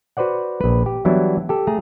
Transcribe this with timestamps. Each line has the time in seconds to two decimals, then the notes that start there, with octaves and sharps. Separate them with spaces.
0.17 F#4 B4 C5 D5 F#5
0.61 A#1 B4
0.86 G4
1.05 E3 F#3 G3 B3 D4 E4
1.49 G4 A4
1.67 A3 G#4 A#5